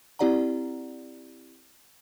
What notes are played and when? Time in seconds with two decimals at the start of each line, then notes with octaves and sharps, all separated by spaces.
0.19 C4 E4 G4 D5 F#5 A#5